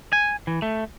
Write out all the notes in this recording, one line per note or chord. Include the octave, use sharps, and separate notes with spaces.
G#5
E3
A3